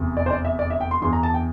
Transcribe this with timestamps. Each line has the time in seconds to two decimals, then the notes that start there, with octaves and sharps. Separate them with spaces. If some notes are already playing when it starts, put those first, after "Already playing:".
Already playing: F1 E2 C3
0.17 D5
0.26 C5
0.31 D5
0.45 E5
0.59 D5
0.70 E5
0.81 G5
0.91 C6
1.02 E2 E3 C6
1.13 A#5
1.23 A5
1.34 G5